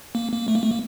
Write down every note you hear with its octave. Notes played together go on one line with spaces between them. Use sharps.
A#3
A#3
A3
A#3
A3
A#3